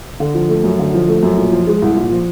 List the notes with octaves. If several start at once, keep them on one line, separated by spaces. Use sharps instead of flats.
D3
F3
A3
F#2
D3
F3
A3
F#2
A#2
F3
G#3
C2
A#2
F3